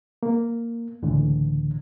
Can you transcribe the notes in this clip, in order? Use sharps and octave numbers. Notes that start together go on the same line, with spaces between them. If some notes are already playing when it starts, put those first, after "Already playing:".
A#3
C#2 A2 D3 E3